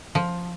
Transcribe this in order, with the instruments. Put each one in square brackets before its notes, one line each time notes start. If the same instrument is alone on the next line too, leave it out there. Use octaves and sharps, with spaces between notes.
[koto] F3